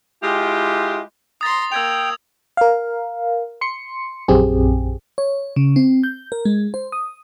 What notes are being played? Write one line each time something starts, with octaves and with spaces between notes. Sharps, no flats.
G#3 E4 F4 G4
A#5 C6 D#6 A6
A#3 G5 E6 G#6 F7
A#4 F5
C6 C#7
A#1 F#2 C4 G4 G#4
C#5
C#3
C4
G6
A#4
G#3
C5
D#6